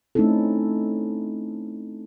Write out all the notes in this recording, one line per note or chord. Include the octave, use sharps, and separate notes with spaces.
A3 C4 C#4 D#4 E4 A4